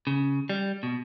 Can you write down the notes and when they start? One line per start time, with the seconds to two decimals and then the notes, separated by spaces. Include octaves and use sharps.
0.07 C#3
0.49 G3
0.83 B2